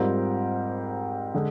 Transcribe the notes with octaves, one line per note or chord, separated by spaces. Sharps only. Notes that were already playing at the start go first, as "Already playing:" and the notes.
Already playing: G#2 G3 C4 F4 A#4
D3 G#3